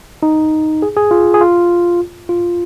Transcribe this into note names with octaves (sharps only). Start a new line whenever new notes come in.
D#4
G#4
G#4
F4
G#4
F4
F4